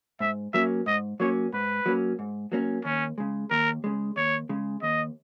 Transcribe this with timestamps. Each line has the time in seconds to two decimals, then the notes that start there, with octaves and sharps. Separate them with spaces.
0.20 G#2 E5
0.54 F#3 A#3 C#4 E5
0.87 G#2 D#5
1.20 F#3 A#3 C#4 C#5
1.53 G#2 B4
1.86 F#3 A#3 C#4
2.19 G#2
2.52 F#3 A#3 C#4
2.85 D#2 C#4
3.18 C#3 G#3
3.50 D#2 A#4
3.84 C#3 G#3
4.17 D#2 C#5
4.49 C#3 G#3
4.82 D#2 D#5